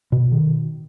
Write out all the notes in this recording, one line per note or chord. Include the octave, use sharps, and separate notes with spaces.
B2
D#3